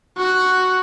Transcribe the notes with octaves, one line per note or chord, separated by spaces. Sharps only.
F#4